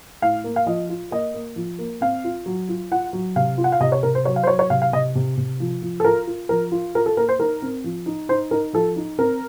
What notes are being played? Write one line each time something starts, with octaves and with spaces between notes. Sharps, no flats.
A2 F5
A#3
F5
F3 D#5
F4
A#3 D#5
A#3
F3
A#3
C4 F5
F4
F#3
F4
F4 F#5
F#3
C3 F5
F4
F#5
F5
C3 D#5
C#5
C3 A#4
C5
F#3 C#5
F5
C5
F#3 C#5
C#5
C3 F5
F5
C3 D#5
C3
C3
F3
F3
A4
F4 A#4
F4
F3 A#4
F4
F4 A#4
A4
A#3 A#4
C5
D#4 A#4
C4
F3
D#4
D#4 C5
D#4 A#4
F3 A4
D#4
C4 A#4